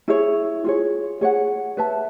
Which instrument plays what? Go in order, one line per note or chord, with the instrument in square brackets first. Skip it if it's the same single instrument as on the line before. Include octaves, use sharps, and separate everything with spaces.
[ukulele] E4 G#4 C#5
F4 G#4 C#5
G#4 C#5 F#5
B4 E5 A5